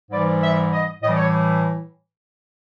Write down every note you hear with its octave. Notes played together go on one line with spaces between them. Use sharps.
G#2 E3 G3 D5
E5
D#5
A2 E3 G3 D5 D#5
C#5